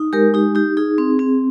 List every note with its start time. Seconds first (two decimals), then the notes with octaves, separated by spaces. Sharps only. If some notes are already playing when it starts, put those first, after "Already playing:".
Already playing: D#4
0.13 G#3 G4 A#4
0.34 D#4 G4
0.55 D#4 G4
0.77 D#4 G#4
0.98 C4
1.19 C4